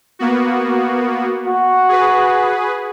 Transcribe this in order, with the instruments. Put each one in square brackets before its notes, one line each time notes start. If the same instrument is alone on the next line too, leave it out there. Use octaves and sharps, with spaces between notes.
[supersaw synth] A#3 B3 F#4
[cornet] F#4
[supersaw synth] G#4 B4